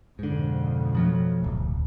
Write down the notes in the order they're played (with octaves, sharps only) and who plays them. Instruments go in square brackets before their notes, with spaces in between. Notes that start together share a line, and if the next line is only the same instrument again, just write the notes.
[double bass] F2 B2 [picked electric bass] G#2 D3
[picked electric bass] F3 F#3 A3
D1 G#1